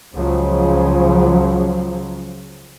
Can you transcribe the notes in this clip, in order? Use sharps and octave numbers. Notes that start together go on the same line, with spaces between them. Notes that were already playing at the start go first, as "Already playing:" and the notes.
C#2 C#3 F3 F#3